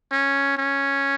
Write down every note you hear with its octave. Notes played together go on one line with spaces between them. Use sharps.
C#4
C#4